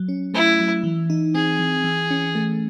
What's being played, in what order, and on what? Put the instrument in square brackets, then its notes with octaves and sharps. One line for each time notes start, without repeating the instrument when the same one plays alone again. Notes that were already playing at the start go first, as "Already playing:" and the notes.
Already playing: [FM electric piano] F#3
C#4
[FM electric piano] A3 [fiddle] E4
[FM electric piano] F#3
E3
D#4
[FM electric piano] C4 [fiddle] G#4
[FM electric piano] E3
E3
C#4
A3